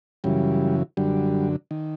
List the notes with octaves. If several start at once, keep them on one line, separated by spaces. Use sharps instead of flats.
F#2 C#3 E3 G3
F#2 D3 G3
D#3